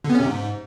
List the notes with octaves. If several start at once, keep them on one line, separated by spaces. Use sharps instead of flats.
D3
B3
C#4
C3
G#2